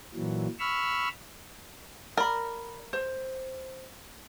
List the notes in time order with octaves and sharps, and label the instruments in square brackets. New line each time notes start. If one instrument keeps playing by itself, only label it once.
[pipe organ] A#2 E3 F#3
B5 C#6 E6 F6
[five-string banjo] A#4 [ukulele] D5 B5
[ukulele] C5